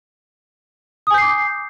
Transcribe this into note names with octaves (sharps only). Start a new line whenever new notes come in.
G#5 D6 D#6 G6 C7